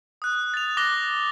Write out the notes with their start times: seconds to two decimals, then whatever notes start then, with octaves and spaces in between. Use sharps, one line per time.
0.22 D#6 F#6
0.54 A6 F7
0.77 D6 F#6 A#6 G7